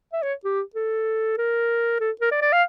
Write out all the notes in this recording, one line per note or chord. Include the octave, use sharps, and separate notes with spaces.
E5
C#5
G4
A4
A#4
A4
A#4
D5
D5
F5